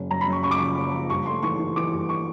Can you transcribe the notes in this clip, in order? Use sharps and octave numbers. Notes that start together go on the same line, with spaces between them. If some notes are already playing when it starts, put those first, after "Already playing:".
Already playing: F#1 F#2
F#2 A#5
B5
F#2
C#6
C#3 C#6
D6
F3 C#6
F#1
F3
G2 C#6
A3 C6
E3 C#6
E3
E3 D6
G2
C#6